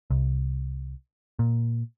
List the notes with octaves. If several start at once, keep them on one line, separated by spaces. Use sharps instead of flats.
C2
A#2